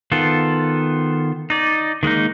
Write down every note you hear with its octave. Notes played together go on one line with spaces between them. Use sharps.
D#3 B3 F4 A4
D#4 D5
D#3 G#3 A#3 D#4